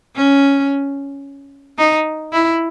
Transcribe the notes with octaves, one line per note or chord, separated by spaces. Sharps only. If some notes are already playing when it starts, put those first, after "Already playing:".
C#4
D#4
E4